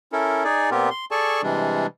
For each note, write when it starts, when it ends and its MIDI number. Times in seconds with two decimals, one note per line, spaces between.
0.12 0.44 61
0.12 0.44 64
0.12 0.44 69
0.12 0.44 70
0.44 0.70 63
0.44 0.70 68
0.44 0.70 74
0.44 0.70 80
0.71 0.89 46
0.71 0.89 59
0.71 0.89 60
0.71 0.89 65
0.71 0.89 67
0.71 0.89 70
0.91 1.05 84
1.11 1.41 68
1.11 1.41 69
1.11 1.41 74
1.11 1.41 80
1.11 1.41 81
1.11 1.41 85
1.43 1.86 48
1.43 1.86 52
1.43 1.86 55
1.43 1.86 56
1.43 1.86 62